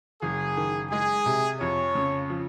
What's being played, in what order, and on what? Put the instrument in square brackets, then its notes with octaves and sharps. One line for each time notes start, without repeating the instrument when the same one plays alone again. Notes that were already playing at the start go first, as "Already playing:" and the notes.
[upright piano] F#1 [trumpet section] G#4
[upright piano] D#3
[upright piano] G#3 [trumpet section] G#4
[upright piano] C3
[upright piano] F2 [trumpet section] C#5
[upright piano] C#3
F3